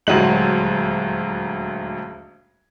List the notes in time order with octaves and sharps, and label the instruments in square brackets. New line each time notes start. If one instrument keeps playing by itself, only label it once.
[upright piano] D#1 D2 F#3 G#3 F#7